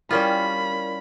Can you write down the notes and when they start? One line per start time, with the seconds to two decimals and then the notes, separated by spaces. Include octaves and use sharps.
0.11 G3 C#4 E4 F4 A#4 D5 B5